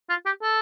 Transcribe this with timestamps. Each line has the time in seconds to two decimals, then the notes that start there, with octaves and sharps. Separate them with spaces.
0.09 F4
0.26 G4
0.42 A4